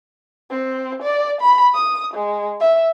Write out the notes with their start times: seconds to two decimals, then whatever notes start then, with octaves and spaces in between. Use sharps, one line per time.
0.50 C4
1.02 D5
1.41 B5
1.74 D#6
2.14 G#3
2.60 E5